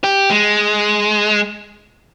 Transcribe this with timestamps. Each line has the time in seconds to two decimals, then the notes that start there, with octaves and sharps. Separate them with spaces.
0.04 G4
0.31 G#3